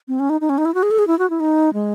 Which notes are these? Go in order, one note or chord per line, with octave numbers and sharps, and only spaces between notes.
C4
C#4
D#4
D#4
C#4
D#4
E4
F#4
G#4
A4
G#4
E4
F#4
E4
D#4
G#3